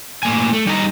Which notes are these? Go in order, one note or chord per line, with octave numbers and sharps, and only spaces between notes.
A2 A#3 G#5
A3
G3 D#4 G4 D#5 F5 A#5